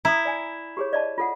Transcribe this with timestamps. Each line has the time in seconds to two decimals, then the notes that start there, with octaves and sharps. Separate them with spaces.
0.05 E4 A#5 D#6
0.25 D5 G#5
0.77 G4 G#4 C#5
0.93 D5 D#5 A5
1.18 F4 A4 F#5